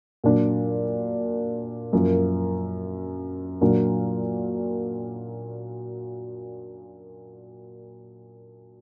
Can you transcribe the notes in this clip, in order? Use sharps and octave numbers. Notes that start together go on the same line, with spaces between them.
A#2 F#3 D4
F#2 F3 A#3
A#2 F#3 A#3 D4